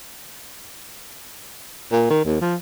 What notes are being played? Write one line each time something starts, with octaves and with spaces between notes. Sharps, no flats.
A#2
D#3
D#2
F3